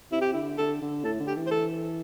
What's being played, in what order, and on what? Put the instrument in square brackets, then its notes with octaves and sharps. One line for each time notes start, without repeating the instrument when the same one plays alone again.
[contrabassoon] C3 [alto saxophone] E4
[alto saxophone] G4
[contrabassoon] D3 [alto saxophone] E4
[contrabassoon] D3 [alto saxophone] A4
[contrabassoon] D3
[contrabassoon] A2 [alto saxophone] A4
[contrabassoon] D3
[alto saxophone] G4
[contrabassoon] E3
[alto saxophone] C5
A4